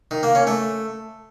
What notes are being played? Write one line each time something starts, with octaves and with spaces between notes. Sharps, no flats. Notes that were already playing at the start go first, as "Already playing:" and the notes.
D#3
A#3
C#4
A3